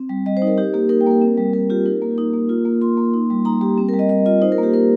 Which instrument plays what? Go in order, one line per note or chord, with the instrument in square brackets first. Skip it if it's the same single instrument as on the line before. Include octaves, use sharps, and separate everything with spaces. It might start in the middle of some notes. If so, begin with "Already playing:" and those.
Already playing: [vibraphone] C4
G3
G3 D#5
C5
D#4
A#4
D#4 G4
A#3 G4
D#4 A#4
G5
A#3 A#4
C4
G3
G3 A#4
F4 G4
D#4 A#4
A#3
D#4
A#3
F4
A#3
F4 C6
A#3
D#4
G3
D#4 A#5
G3 G4
C4
G3 A#4
D#5
G3 D#5
F4 D#5
D#4 C5
A#4
A#3
G4
D#4 A#4